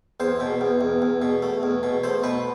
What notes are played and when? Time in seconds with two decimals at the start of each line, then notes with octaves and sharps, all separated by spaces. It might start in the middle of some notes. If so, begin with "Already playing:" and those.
0.20 E2 C5
0.40 B2
0.61 E2
0.81 E2
1.02 E2
1.22 B2
1.42 A3
1.63 E2
1.83 B2
2.04 A3 C5
2.24 B2 B4